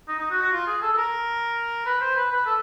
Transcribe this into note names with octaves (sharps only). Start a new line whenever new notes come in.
D#4
D#4
F#4
F#4
F4
G#4
A4
A4
A#4
B4
C5
B4
B4
A4